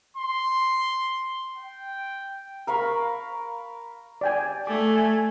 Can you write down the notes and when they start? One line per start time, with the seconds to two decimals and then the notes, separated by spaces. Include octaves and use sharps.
0.17 C6
1.58 G5
2.67 A#4 F5 B5 C#6
4.21 D5 G5 G#5
4.67 A3 G#5 D6